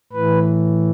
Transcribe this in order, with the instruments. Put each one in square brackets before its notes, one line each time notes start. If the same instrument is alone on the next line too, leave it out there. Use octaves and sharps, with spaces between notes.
[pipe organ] A2 E3 B4